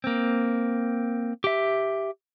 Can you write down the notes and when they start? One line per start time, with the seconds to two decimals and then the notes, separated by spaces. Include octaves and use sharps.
0.04 A#3 C4
1.44 G4 E5